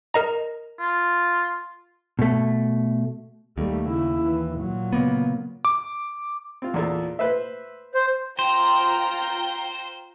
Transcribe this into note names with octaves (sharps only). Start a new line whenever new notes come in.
A#4 D#5 A#5
F4
B2 A3
D#2 G3 A3
C#3 E4
E3
A#2 F#3
C#3 A#3 B3
D6
C4 F4
E2 A#2 A4
B4 C5 E5
C5
F4 C5 G5 A#5